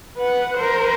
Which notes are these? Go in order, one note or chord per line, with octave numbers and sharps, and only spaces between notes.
B4 F#5
A#4 C5